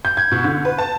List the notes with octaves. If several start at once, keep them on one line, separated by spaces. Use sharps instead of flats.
G6
G#6
B2
D3
B4
A5